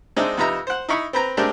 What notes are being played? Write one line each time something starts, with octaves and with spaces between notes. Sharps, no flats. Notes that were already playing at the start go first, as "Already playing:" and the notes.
G#3 C4 D4 D#4 E5
F2 C3 D#4 B4 E5 A#5
C5 F#5
D#4 E4 B5 C#6
C4 B4 A#5
G#3 A3 C4 D4 G4 A#4